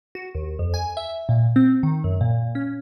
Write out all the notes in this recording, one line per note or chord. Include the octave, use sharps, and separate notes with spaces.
F#4
D#2
F2
G#5
E5
A#2
C4
D#3
F#2
A#2
C#4